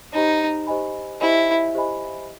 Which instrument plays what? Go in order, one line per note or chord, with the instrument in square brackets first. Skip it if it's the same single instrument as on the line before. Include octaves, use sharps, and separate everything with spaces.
[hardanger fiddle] D#4 [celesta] G4 C5 D#5 G#5 B5
[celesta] G4 C5 D#5 G#5 B5
[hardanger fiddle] E4 [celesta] G4 C5 D#5 G#5 B5
[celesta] G4 C5 D#5 G#5 B5